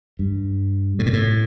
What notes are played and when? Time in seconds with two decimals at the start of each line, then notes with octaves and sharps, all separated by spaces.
0.19 G2
0.99 A2
1.06 A#2
1.13 A2